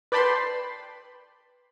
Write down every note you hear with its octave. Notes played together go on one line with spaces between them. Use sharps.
B4 D5 G5 A5 B5 C6